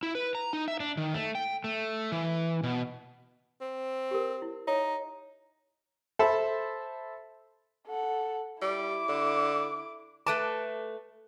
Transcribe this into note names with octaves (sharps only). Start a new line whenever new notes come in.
E4
B4
A#5
D#4
E5
D4
D#3
A3
G5
A3
E3
B2
C4
G4 A#4
E4
D#4 C#5 E5
A4 C5 E5 B5
A4 F#5
G3 E4 D6
D3
A3 B4 A5 D6